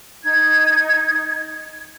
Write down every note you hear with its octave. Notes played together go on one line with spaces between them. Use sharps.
D#4 G#6